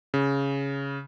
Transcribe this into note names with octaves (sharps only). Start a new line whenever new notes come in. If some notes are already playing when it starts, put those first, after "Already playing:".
C#3